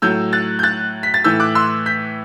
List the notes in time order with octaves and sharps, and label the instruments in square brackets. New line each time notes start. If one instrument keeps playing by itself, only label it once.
[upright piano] A2 F#3 E6 G6
F#6 A6
G6
F#6 A6
B6
A6
A2 E3 E6 G6
D6 F#6
C6 E6
G6 B6